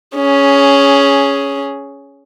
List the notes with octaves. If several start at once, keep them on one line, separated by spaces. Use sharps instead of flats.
C#4 G#4